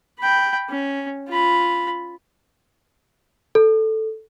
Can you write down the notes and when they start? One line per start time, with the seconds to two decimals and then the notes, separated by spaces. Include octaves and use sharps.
0.20 G5 B5
0.69 C#4
1.28 F4 B5
3.55 A4